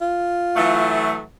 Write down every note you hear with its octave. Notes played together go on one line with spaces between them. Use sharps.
F4
E3 F#3 A3